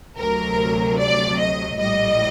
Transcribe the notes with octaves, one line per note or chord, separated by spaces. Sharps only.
D2 C3 F#3 A#4
D5
D#5
A#1 A2 G3 D#5